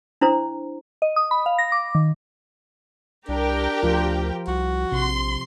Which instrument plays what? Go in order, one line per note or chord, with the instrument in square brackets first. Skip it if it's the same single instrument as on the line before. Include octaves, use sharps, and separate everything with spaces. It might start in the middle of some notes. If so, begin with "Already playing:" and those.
[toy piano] D4 E4 C5 A#5
[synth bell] D#5
D#6
B5
F5
A#6
D6
D#3
[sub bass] C2 [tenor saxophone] D4 [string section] G4 A#4 G5
[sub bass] D2 [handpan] F3 F4
[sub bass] C2 [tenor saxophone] F#4
[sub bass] A#1 [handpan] C3 [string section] C6